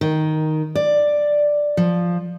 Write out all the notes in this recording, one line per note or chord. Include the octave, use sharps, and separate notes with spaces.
D#3
D5
F3